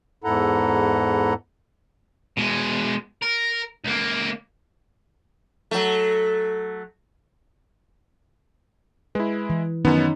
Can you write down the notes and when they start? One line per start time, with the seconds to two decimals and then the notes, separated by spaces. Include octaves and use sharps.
0.24 E2 G#2 E4 A4 F#5 A#5
2.37 B2 G#3
3.22 A#4
3.84 C#2 A#3
5.71 F#3 A3
9.15 G#3 E4 B4
9.50 E3
9.85 F#2 D#3 B3 C#4 D#4